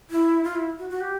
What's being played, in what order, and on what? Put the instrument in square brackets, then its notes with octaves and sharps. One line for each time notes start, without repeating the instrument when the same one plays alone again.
[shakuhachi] E4
F4
E4
F#4
F#4
G4